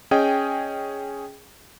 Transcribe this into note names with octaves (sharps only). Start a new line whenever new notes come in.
C#4 G#4 D#5 G5